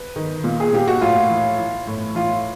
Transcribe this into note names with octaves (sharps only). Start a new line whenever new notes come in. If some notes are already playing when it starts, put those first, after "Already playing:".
Already playing: B4
D#3
A#2
G#4
A#2 G4
F#4
A2 F4
E3
E3
A2
E3 F4